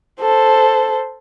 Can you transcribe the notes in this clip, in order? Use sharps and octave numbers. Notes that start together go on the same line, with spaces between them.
A4 C5